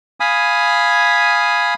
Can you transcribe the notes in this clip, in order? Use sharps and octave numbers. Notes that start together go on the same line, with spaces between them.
F5 G#5 B5 D#6